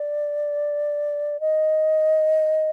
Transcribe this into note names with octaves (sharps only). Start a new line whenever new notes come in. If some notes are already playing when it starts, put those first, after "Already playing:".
Already playing: D5
D#5